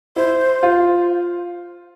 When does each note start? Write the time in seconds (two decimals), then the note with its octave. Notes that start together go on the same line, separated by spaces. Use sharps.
0.16 E4 C5
0.63 F4